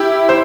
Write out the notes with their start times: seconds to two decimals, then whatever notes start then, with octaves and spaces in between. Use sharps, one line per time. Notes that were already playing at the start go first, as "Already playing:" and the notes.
Already playing: E4 G4
0.29 C5